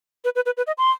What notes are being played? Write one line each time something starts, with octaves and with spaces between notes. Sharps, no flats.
B4
B4
B4
B4
D#5
C6